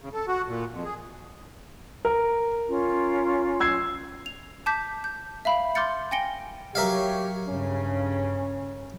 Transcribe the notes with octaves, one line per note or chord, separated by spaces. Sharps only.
C#3
A4
F#4
A#2
F2
G#4
A#4
C#4 F4
E6 G#6 C7
F7
A5 D6 G6 B6
G6
E5 F5 B5
C6 D6 F6 G6 A6 C#7
G5 G#5 A#6 C#7 D7 G7
F#3 G4 A#4 C#5 E5 F5
G2 C#3 C#4